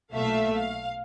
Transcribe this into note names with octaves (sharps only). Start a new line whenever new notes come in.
B1 A#2 A3 E5 F5
F5